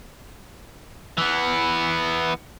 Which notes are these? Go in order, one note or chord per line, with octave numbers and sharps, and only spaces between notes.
E3 B3